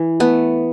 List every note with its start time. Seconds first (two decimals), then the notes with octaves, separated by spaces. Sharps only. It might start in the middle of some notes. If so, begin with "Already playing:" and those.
Already playing: E3
0.20 A3 B3